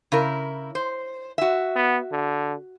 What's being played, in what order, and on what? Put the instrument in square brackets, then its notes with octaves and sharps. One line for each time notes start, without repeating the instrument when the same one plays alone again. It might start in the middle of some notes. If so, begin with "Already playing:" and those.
[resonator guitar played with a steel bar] C#3 E4 A#4
C5
F#4 E5
[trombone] B3
D3